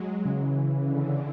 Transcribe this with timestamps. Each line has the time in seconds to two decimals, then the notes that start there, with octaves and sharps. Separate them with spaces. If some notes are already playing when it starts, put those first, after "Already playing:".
Already playing: F#3 G#3
0.25 C#3 E3
0.79 D3